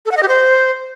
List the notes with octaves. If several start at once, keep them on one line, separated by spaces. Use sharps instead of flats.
A4
F#5
D#5
G4
C5